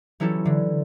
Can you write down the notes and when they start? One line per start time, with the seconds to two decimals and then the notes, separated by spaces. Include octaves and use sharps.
0.20 E3 F#3 C#4 E4 G4 A4
0.45 D3 E3